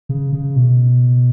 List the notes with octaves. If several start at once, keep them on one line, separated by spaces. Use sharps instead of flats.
C#3
C#3
B2